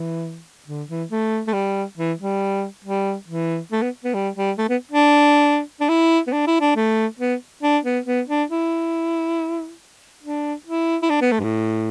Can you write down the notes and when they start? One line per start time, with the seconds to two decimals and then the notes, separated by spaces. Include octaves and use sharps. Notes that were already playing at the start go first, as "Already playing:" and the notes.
Already playing: E3
0.68 D3
0.89 E3
1.11 A3
1.47 A3
1.53 G3
1.98 E3
2.20 G3
2.84 G3
3.28 E3
3.72 A3
3.82 B3
4.05 B3
4.14 G3
4.36 G3
4.58 A3
4.69 B3
4.91 D4
5.81 D4
5.89 E4
6.27 B3
6.33 D4
6.47 E4
6.61 D4
6.76 A3
7.19 B3
7.63 D4
7.84 B3
8.06 B3
8.28 D4
8.50 E4
10.23 D4
10.66 E4
11.02 E4
11.10 D4
11.21 B3
11.32 A3
11.40 G2
11.43 A2